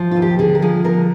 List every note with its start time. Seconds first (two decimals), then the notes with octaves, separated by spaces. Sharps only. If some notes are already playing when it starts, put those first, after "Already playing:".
Already playing: F3
0.11 D#2 F4
0.22 G4
0.39 D3 G#4
0.55 A#4
0.62 F3 G#4
0.84 D3 A#4